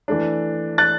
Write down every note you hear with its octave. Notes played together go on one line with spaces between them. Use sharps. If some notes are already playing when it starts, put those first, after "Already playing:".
E3 A3 D4
F#6 A6